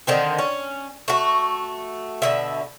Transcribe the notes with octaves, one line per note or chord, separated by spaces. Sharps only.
D3 D#3 C4
C#4
A3 F#4
B2 D3 E5